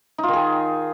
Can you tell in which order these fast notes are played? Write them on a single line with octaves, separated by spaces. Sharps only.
D#4 F4 D#3 G#4